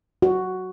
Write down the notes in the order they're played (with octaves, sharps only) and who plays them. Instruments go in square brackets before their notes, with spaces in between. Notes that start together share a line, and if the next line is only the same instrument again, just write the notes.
[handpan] F#4